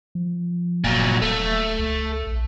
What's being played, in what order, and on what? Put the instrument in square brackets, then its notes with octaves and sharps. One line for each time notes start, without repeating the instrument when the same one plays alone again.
[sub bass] F3
[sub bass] E1 [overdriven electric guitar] A#2 F#3
[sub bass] D#1 [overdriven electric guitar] A3
[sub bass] C#2
A#1